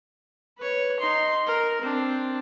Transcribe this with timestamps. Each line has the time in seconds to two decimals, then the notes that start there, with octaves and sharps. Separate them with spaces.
0.57 B4 C#5
0.99 D#4 C6
1.46 A#4
1.81 C4 D4